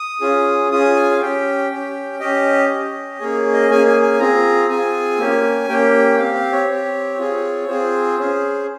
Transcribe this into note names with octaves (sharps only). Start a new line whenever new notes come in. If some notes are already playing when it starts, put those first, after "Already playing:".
Already playing: D#6
C#4 F4 G#4
C#4 F4 G#4 D#6
G#5
F5
C#4 G4 G5
C#4 G4
C#4 G4 D#5
C#4 G4
A#3 C#4 G#4 C#5
D#5
A#3 C#4 G#4 G#5
G#5
G#5
C4 F4 G#4 A#5
C4 F4 G#4 G#5
A#3 C#4 G4
A#3 C#4 G4 G5
C4 G4 F5
F5
C#5
C4 G4
C4 F4 G#4
C4 F4 G#4 C5
C#4 G#4